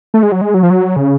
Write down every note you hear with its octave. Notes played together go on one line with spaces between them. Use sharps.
A3
G#3
F#3
G#3
F#3
F3
F#3
C#3